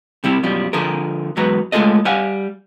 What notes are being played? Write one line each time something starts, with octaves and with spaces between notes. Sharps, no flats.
C3 G3 E4
F#2 B2 F3 G3
D3 F3 G#4 A#4
E2 G#2 F#3 B3 A#5
G#3 A3 F4 G#4 A4 D#5
G3 F5 F#5 G#5